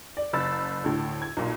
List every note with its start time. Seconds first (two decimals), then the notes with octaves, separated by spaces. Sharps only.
0.17 D5
0.33 F#1 B5 E6 A6
0.84 D2 A2
1.22 G#6
1.37 B1 A#2